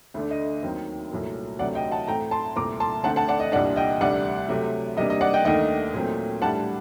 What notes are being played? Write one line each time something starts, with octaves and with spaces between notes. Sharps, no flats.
D2 D3 A3 D4
D#5
D#2 D#3 F#3 C4
C2 A#2 F#3 A3
D2 C3 F#3 A3 C4 D5 F#5
D#5 G5
F#5 A5
A2 A3 C4 G5 A#5
A5 C6
C2 A#2 A3 C4 A#5 D6
A5 C6
D2 D3 A3 C4 F#5 A5
F#5 A5
D5 F#5
D#5
C2 A#2 G3 D4 D5 F#5
D#5 G5
D2 C3 G3 D4 D5 F#5
C3 F#3 A3
C3 G3 A#3 D4 D#5
D#5
D5 F#5
D#5 G5
D#2 D#3 A3 D4 D#5 G5
A#2 F#3 A3 C4
A2 G3 D4 F#5 A5